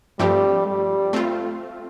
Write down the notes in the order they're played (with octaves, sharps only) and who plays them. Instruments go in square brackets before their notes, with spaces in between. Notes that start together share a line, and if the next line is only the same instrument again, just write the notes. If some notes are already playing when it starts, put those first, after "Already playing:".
[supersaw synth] G2 F3 A3 C4 G4 [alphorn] G3
[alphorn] G3
[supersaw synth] A3 C4 F4